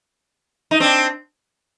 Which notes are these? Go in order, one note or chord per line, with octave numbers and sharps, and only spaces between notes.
D#4
C4 D4